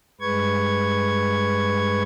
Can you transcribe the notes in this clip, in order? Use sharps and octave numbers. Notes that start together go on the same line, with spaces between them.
G2 G#3 B4 C#6 G#6